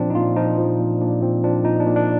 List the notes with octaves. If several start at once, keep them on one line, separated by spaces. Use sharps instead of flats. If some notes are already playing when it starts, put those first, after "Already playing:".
Already playing: A#2 F3 C4 D4
D#4
A#2 F4
F3 D#4
F3
A#2
A#2 D4
A#2 C4
F3 D4
A#2 D#4
D4
A#2
D4